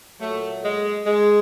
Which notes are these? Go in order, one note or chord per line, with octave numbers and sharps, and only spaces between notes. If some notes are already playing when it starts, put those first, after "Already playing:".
A#2 F#3 A3
G#3
G#3